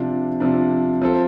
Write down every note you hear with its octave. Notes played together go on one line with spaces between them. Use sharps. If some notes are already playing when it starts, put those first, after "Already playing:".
Already playing: C3 F3 D4
C3 F3 D4
F3 C4 A4